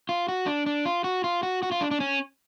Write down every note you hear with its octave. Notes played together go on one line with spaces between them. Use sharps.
F4
F#4
D4
D4
F4
F#4
F4
F#4
F#4
F4
D4
D4
C#4